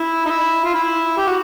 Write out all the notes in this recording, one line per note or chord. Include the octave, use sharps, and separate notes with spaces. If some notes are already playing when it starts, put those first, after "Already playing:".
Already playing: E4
D#4
E4
F4
E4
G4
F#4